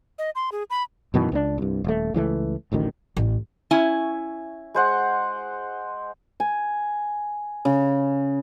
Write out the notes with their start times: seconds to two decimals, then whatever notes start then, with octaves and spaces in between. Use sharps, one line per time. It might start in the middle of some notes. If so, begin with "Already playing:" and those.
0.19 D#5
0.35 C6
0.52 G#4
0.70 B5
1.14 F#2 B2 D#3 E3
1.32 C#2 B3 D4
1.58 C2 G2
1.84 D#1 A3
2.14 C#2 E3 F#3 A3
2.72 D1 A1 D2 D#3
3.17 A1
3.71 C#4 E4 G#5
4.74 G#3 C5 F#5
6.40 G#5
7.65 C#3